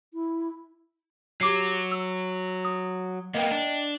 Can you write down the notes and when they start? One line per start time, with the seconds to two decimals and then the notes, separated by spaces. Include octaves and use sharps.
0.14 E4
1.41 F#3 G4 D6 C7
1.92 E6
2.65 D#6
3.34 A#3 B3 D#5 G5
3.51 D4